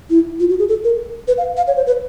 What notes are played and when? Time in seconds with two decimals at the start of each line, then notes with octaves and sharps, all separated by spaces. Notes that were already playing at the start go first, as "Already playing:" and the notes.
0.10 E4
0.40 F4
0.49 F#4
0.59 G#4
0.69 A4
0.84 A#4
1.28 B4
1.38 F5
1.57 F5
1.67 C#5
1.77 C5
1.87 B4